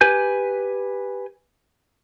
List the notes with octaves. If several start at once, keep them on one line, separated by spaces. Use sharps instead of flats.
G4 B4 G#5 G6